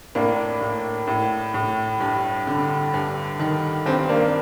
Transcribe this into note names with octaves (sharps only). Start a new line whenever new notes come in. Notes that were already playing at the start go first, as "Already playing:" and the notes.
A2 A#3 D4
A2
A2
A2
G2
D3
G2
D#3
G2 C4
A#3 D4